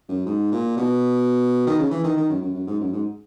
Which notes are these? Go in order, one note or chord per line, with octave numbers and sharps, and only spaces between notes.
F#2
G#2
A#2
B2
D#3
C#3
E3
D#3
D#3
F#2
F#2
F#2
G#2
F#2
G#2